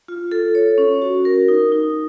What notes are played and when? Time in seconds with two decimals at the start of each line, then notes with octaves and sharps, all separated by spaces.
0.08 F4
0.32 A4
0.55 C#5
0.78 C#4
1.02 F#4
1.25 A#4
1.48 D#4
1.72 D#4